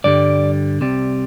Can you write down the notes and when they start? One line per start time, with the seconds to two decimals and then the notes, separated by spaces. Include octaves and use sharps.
0.04 G2 D3 G3 D5
0.81 C2 C3 G3